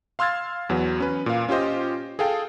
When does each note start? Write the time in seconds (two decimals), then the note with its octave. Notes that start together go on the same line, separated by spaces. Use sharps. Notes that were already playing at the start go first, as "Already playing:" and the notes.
0.19 F5 C6 E6 F6 G#6 A6
0.69 E2 F#3 B3
1.00 C#4 B4
1.26 A#2 F5
1.49 C#4 F4 G4 C5 D#5
2.19 G#4 A4 F5 G5 A5